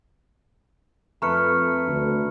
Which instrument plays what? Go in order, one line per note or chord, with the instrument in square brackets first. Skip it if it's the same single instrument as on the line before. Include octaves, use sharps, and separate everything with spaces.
[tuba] F2 [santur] A3 B4 [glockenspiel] A#5 F6 C#7
[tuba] D2